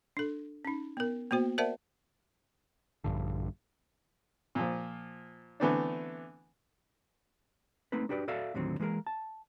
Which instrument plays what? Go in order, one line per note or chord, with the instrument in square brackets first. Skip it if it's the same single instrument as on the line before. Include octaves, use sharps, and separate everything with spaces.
[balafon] D4 A4
C#4 D#4
B3 A#4
A#3 B3 F#4 C5
A#4 C5 D5 E5 F#5 A5
[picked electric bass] A#1 G2 D3
[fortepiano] A#2 F3
D3 E3 A3 B3 C4 D4
[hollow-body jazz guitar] A3 A#3 C4 D#4 B4
D4 F#4 G4 B4 D5
F#4 A4 D5 E5 F5
D#2 A2 D3 D#3 F#3 C4
E3 G#3 A#3 G#4 A#4
A5